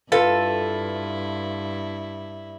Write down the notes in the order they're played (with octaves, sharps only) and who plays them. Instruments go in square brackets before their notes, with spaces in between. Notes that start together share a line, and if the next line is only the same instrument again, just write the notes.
[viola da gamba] G2 E4 [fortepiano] F4 [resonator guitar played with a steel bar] A4 B4